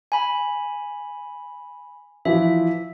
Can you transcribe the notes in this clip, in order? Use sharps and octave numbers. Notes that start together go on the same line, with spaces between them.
G#5 B5
E3 F3 F4 E5